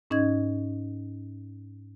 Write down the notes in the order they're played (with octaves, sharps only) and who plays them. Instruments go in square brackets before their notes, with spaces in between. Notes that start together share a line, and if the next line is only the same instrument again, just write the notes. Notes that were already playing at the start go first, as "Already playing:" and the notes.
[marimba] G#2 C#4 D#4 D#5 G#6